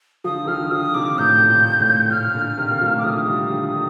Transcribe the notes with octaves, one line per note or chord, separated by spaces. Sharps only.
D3 F3 D#6
D#3
D3 F3 F6
D#3
D3 F3 D#6
C3 D#3 D6
A2 C3 G6
A#2
A2
A#2 F6
A#2 D3
C3 D#3
A#3
F3 A3
D6
D3 F3 D#6
F3
D#3 G3
D3 F3
C3 D#3